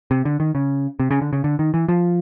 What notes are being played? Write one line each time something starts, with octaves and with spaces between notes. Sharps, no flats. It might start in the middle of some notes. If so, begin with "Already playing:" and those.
C3
D3
D#3
C#3
C3
C#3
D3
C#3
D3
D#3
E3
F3